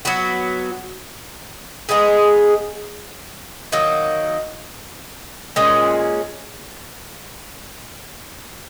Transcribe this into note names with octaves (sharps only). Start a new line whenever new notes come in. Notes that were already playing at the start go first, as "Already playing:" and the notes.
F#3 B3 F#4
G#3 B3 D#4 G#4
D#3 F#3 A#3
A#2 G#3 C#4